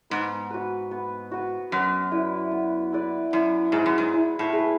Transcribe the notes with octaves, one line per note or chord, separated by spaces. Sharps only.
G#2 B3
F#4 B4
B3
F#4 B4
F#2 B3
E4 B4 D5
B3
E4 B4 D5
F#2 E4
G#2 G#4 B4
F#2
G#2
E4
A2
G#4 B4